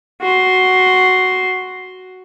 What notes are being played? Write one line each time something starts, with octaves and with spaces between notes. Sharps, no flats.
F#4 C6